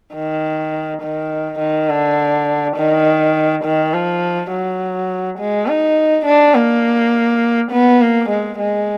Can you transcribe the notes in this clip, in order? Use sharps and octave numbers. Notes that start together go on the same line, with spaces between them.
D#3
D#3
D#3
D3
D#3
D#3
F3
F#3
G#3
D#4
D4
A#3
B3
A#3
G#3
G#3